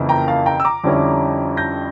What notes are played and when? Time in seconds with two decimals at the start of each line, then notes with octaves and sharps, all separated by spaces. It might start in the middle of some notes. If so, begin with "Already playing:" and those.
Already playing: F2 C#3 E3 A#3 E4
0.09 G5 A#5
0.28 F5 A5
0.46 G5 A#5
0.60 E6
0.65 A#5 D6
0.84 F2 D3 G3 C#4 E4
1.57 G6 A#6